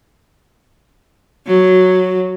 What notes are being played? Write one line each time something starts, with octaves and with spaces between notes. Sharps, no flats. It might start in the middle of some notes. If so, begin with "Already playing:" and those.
F#3